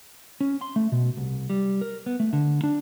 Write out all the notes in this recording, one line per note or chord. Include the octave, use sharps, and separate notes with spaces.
C#4
C6
A3
B2
C2
G3
A#4
B3
A3
D3
D4